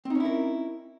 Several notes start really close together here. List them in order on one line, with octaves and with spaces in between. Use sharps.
C4 D#4 C#4 E4 A#4